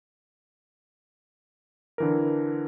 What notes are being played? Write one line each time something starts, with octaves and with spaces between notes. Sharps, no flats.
D3 E3 A#4